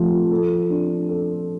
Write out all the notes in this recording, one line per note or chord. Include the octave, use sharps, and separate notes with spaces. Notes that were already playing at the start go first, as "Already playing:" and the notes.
Already playing: F3 A3
A4
D4
A4